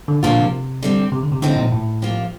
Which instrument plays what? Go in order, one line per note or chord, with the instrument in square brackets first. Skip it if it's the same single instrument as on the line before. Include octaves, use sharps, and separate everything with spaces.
[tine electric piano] D3
[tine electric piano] A#2 [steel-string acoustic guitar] D3 F3 A#3 F4 A4
[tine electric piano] C3
[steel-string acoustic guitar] D3 G3 C4
[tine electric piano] C3
D3
C3
[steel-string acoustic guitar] A2 F3 C4 D#4 [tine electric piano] D3
[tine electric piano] A#2
A2
[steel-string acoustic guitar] C3 F3 A#3 F4